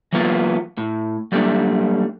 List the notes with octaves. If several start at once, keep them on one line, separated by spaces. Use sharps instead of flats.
E3 F#3 A#3 B3 D#4 F4
A2
F#3 G3 A3 A#3 D4